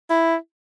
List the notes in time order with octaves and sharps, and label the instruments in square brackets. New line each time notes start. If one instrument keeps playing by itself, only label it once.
[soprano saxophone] E4